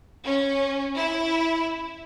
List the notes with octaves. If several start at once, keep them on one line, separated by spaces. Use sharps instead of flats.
C#4
E4